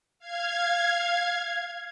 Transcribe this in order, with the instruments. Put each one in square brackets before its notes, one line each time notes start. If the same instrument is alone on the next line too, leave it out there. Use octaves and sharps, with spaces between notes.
[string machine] F5 G#6